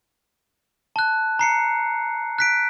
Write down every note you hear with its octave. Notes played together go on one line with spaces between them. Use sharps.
A5 F#6
A#5 C7 C#7
F#6 B6 D7